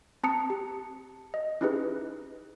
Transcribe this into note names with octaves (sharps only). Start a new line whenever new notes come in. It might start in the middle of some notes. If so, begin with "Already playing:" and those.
C4 A5 A#5 D#6 C#7
G4
D#5
C#4 D#4 E4 G4 G#4 B4